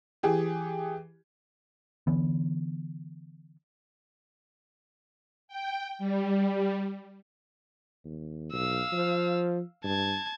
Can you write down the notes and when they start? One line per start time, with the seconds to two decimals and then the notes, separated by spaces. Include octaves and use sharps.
0.23 E3 G4 G#4
2.07 D3 E3 B3
5.48 G5
5.99 G3
8.05 D#2
8.53 B1 F5 E6
8.93 F3
9.84 G2 A5 G#6